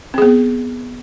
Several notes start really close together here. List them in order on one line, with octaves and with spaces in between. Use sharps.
C4 G#4 B3